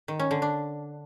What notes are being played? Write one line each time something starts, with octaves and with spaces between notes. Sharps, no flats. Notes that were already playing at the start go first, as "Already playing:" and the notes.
D#3
C#4
D3
D4